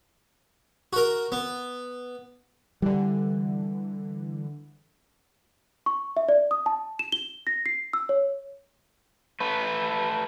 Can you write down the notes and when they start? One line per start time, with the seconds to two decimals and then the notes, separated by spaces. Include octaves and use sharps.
0.93 F#4 A#4
1.32 B3
2.82 D3 E3 G3
5.86 C#6
6.17 E5
6.29 D5
6.51 D#6
6.66 A5
6.99 E7
7.12 G7
7.47 A#6
7.66 C7
7.93 E6
8.09 C#5
9.40 A3 B4